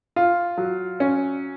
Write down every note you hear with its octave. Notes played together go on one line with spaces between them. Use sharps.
F4
F#3
C#4